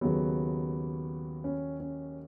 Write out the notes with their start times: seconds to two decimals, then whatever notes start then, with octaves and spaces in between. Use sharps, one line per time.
0.01 D#2 C#3 F#3 B3
1.44 C#4
1.80 C#4